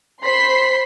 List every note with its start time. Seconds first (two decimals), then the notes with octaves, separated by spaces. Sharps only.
0.24 C5 B5 C6 B6 C7